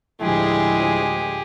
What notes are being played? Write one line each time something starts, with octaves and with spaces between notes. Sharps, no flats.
D2 A2 F3 G#3 E4 G4 G#4